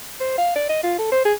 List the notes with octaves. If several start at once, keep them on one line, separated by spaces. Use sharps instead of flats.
C5
F5
D5
D#5
F4
A4
C5
G#4